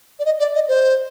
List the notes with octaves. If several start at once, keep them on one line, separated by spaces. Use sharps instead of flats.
D5
D#5
D5
D#5
C5